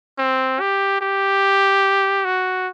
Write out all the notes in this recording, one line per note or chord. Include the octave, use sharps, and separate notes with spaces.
C4
G4
G4
F#4